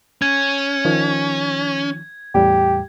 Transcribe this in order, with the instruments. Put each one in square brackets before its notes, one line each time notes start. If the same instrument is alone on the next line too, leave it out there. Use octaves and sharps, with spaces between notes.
[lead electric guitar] C#4 [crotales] G#6
[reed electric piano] D#3 F3
[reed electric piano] E2 A2 G3 [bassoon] G4